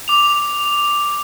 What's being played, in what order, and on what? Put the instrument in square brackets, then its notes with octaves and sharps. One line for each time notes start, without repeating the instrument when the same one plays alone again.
[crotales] D6 F7